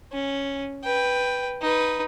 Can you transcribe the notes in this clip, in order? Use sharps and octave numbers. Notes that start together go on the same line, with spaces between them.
C#4
B4 G5
D#4 B4